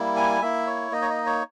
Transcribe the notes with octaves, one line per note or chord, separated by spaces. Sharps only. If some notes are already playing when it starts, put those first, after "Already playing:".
Already playing: G3 A#3 E4
G#5
A#3 E4 E5
C#5
A#3 D#4 D#5
C#5
D#5
C#5